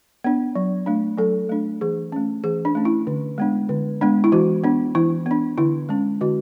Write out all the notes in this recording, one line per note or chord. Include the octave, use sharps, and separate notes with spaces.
B3 D4
F#3
A3 D4
F#3 A4
A3 D4
E3 G#4
A3 C#4
E3 G#4
D4
A3 C#4
E4
D3
G#3 B3 D4
D3
G#3 B3 D4
E4
E3 F#4
B3 D4
E3 E4
B3 D4
D3 E4
G#3 C#4
D3 F#4